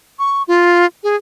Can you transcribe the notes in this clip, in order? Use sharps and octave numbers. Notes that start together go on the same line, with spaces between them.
C#6
F4
G#4